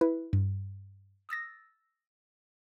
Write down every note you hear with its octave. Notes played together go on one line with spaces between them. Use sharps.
E4 B4
G2
D#6 E6 A6 A#6